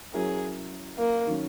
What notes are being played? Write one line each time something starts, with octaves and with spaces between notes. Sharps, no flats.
F#3 C#4 E4 G#4 A#4
A#3
D#3 F#3 C#4